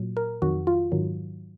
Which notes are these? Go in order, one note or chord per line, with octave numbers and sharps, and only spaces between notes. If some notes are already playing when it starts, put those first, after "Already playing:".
Already playing: A#2 F#3
A#4
F2 D#3 F#3 F#4
F4
G#2 D#3 F#3